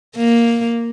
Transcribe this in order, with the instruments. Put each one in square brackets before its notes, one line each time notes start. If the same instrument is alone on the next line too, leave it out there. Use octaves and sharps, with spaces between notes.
[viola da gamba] A#3